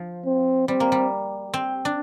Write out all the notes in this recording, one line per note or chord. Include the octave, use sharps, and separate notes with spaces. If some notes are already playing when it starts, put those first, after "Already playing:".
Already playing: F3
C4
G3 C4
A#3
G3
C4
D4